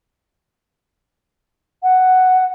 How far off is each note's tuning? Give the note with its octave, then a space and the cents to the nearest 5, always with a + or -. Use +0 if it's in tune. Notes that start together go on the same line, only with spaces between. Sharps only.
F#5 +5